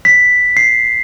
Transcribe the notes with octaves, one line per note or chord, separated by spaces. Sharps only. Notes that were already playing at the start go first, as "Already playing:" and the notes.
B6
C7